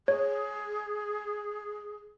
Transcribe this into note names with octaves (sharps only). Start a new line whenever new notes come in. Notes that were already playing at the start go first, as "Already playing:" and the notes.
G#4 C#5